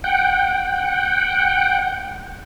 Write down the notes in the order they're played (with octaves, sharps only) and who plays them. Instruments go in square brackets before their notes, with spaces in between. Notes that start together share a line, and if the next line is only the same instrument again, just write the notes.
[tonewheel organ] F#5 G5